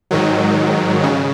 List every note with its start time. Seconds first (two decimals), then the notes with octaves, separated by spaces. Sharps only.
0.11 G#2 D#3 F#3
1.03 C#3